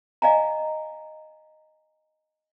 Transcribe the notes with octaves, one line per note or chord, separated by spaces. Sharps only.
D#5 F5 G#5 A#5